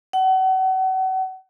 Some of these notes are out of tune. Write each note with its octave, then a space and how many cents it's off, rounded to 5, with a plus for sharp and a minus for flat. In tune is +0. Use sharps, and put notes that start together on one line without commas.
F#5 +35